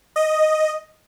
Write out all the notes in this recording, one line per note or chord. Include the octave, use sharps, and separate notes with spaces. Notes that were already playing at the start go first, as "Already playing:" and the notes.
D#5